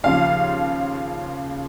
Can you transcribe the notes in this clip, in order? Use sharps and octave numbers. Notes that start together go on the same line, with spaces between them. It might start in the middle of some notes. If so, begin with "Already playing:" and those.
D#2 C#3 F3 F5